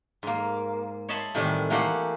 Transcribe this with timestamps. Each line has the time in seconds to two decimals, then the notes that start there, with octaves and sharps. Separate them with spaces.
0.23 G#2 A#3
1.09 C#5 D#5 E5 A5 B5 C6
1.35 A2 C3 D#3 E3 G3
1.70 E3 A3 A#3 G4 F#5 C6